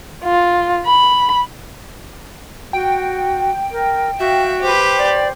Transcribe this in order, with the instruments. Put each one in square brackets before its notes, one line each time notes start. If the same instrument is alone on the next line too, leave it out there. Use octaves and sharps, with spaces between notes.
[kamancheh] F4
B5
[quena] F#4 [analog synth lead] G5
[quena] A#4
[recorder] F#4 [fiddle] E5 [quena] F5
[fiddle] G4 B4 [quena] C5
[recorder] D5